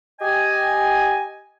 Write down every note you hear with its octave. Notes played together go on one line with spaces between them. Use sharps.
G4 D#5 G#5